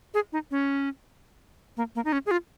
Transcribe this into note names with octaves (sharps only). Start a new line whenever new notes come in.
G#4
D#4
C#4
A#3
A#3
D#4
C#4
G#4
F4